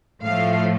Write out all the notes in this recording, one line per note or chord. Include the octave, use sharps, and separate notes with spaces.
A2 F3 A3 F5